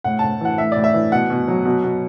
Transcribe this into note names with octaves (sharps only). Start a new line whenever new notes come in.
A2 F#5
A5
A2
E3 F#5
A2 E5
A2 D5
E5
E3
B2 F#5
B2
F#3
B2
B2